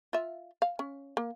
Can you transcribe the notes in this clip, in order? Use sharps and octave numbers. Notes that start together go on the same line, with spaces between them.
F4 E5
F5
C#4
A#3